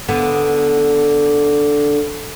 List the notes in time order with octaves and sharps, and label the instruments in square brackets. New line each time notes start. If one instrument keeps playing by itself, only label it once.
[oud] D3 B3